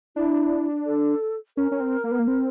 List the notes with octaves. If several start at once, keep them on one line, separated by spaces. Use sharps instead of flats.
D4 E4
A4
C#4 A#4
C#4
C4
A#3
B3
A#3
C4